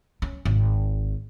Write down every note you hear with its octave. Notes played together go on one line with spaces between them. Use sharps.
C#4
G#1